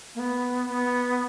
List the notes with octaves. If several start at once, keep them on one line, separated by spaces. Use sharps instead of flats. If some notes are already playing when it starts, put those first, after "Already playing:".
A#3
B3
B3